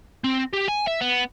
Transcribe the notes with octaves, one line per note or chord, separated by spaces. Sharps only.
C4
G4
G#5
E5
B3